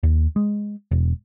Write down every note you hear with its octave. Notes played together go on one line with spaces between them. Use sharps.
D#2
G#3
E1